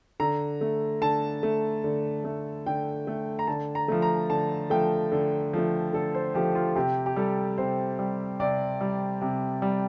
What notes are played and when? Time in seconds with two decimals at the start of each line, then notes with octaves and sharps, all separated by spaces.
0.20 D3 A#5
0.61 A3
1.01 D3 A5
1.43 A3
1.84 D3
2.24 A3
2.66 D3 G5
3.07 A3
3.39 A#5
3.47 D3 A5
3.75 A#5
3.88 F3 A3
4.02 A#5
4.30 D3 A5
4.70 F3 A3 G5
5.12 D3
5.53 F3 A3
5.93 D3 A4
6.15 C5
6.35 F3 A3 G4
6.55 F4
6.76 C3 G4
7.06 G4
7.16 G3 A4
7.58 C3 C5
7.99 G3
8.40 C3 D5
8.81 G3
9.21 C3
9.62 G3